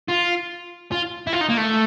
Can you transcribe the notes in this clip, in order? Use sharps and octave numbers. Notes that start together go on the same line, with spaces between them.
F4
F4
E4
F4
D#4
A#3
A3